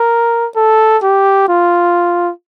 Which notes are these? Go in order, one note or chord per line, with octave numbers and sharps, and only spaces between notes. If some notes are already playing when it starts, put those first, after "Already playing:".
Already playing: A#4
A4
G4
F4